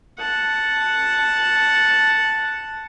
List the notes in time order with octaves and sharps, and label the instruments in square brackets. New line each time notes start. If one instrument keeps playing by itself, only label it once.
[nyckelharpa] F#5 A5